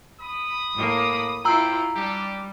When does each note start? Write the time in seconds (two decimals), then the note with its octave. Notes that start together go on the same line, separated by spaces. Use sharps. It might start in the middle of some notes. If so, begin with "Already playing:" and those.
0.20 B5 D#6
0.75 A2 A#3
1.45 C4 E4 F4 G4 G5 A#5 E6
1.95 G3 D4 G4